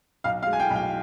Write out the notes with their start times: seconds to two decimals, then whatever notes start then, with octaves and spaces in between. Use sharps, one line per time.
0.24 B1 F5
0.43 F5
0.47 G#3
0.53 G#5
0.60 G5
0.70 B1
0.76 G5